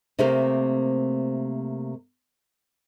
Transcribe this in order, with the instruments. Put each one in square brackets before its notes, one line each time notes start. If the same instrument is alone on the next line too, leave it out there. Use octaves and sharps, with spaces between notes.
[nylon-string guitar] C3 A3 A#3 C4 G4 A#4